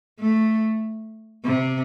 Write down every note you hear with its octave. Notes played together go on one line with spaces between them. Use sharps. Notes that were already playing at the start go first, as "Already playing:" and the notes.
A3
C3